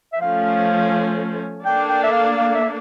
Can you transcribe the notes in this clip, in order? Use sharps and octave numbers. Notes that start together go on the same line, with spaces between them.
E5
F3 A3 C#4 F5
A#3 D4 A4 G5
G5
E5
F5
F5
E5